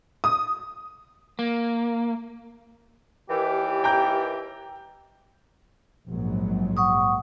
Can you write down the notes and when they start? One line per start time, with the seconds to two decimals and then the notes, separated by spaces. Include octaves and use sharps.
0.24 D#6
1.39 A#3
3.30 D#2 E3 G4
3.84 G5 A#5 G6
6.08 A#1 G#2 F#3
6.77 F#5 C#6 D#6